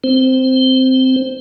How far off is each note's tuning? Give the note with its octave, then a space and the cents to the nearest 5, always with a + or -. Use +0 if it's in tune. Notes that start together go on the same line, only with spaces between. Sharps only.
C4 -10 C5 +0